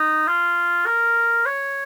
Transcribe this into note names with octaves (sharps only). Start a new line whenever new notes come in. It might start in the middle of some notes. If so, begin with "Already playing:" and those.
Already playing: D#4
F4
A#4
C#5